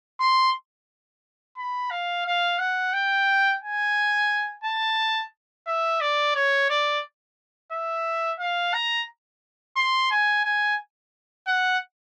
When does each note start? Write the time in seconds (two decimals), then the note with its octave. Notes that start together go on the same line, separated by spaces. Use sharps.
0.20 C6
1.58 B5
1.91 F5
2.26 F5
2.59 F#5
2.93 G5
3.62 G#5
4.64 A5
5.67 E5
6.01 D5
6.35 C#5
6.70 D5
7.72 E5
8.39 F5
8.74 A#5
9.76 C6
10.11 G#5
10.45 G#5
11.47 F#5